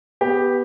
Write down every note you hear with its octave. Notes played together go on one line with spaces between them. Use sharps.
B3 G4